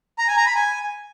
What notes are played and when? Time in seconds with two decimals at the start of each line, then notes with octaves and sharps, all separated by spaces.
0.18 A#5
0.28 G#5
0.37 A#5
0.46 B5
0.55 G#5